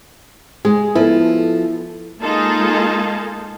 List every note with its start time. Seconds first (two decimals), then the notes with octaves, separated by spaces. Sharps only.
0.65 G#3 G#4
0.95 F3 B3 E4 A4
2.20 G#3 A#3 D#4 F4 G#4 A4